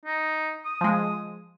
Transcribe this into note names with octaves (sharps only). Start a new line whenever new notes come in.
D#4
D#6
F3 G#3